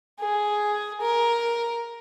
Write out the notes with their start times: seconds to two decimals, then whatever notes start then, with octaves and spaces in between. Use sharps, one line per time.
0.20 G#4
1.01 A#4